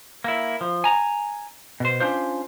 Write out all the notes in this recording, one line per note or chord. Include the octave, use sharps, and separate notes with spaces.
A#3 E4
F3
G#5 A#5
B2 C5
C#4 D4 F4 C5